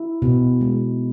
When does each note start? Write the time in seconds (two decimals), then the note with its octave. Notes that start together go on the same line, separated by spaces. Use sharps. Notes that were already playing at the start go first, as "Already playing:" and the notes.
Already playing: E4
0.22 B2
0.61 G#3